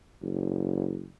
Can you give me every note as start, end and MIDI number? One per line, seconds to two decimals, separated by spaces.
0.22 1.07 30